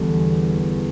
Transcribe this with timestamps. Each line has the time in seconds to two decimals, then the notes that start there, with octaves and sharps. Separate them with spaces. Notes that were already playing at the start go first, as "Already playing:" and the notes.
Already playing: E2 D3 G3